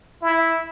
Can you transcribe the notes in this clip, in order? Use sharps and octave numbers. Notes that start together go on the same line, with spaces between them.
E4